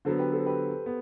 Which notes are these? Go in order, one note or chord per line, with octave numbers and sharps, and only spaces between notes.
D3 F#3 B3 A4 C5
G4 B4
A4 C5
G4 B4
B3